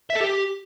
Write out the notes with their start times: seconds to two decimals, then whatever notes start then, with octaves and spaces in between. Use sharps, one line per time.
0.10 E5
0.15 A4
0.21 G4